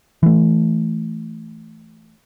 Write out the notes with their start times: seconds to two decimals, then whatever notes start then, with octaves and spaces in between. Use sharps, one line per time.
0.23 E3 A3